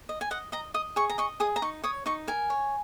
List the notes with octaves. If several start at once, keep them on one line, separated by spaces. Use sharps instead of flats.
D#5
G#5
D#5 F#5
D#5 A#5
D#5 D#6
G#4 C#6
A#5
D#5 C#6
G#4 D#6
A#5
D#4 C#6
C#5 D#6
D#4 C#6
A#4 G#5
C#5